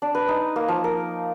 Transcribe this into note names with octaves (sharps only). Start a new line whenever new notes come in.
D4
B4
D#4
A#3
F3
A#4